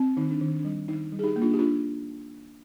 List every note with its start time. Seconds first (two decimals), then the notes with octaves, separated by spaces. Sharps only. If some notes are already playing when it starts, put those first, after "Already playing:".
Already playing: C4
0.17 D#3 D#4
0.31 D4
0.41 D#3
0.59 D4
0.65 G3
0.88 D#3 D#4
1.12 G3
1.19 G#4
1.24 D#4 G4
1.36 A#3
1.42 D4 F4
1.53 G4
1.59 D4 F4